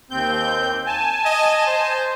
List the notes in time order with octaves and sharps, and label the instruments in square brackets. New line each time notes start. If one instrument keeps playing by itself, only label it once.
[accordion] D#2 C4 G6
G#5 A5
[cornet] D#5
C5